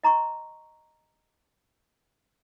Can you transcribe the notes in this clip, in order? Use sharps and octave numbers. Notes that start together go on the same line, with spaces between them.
D#5 A#5 C6 C#6